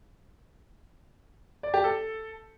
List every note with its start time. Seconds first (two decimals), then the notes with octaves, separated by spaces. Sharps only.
1.63 D5
1.74 G4
1.84 A4